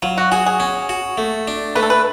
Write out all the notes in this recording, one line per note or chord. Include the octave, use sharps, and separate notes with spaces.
F#3 F4
F#4
F#4 G#4
G#4
C#4
F#4
A3
D4
A3 B4
A4
B4